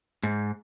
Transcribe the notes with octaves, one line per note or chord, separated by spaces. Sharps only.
G#2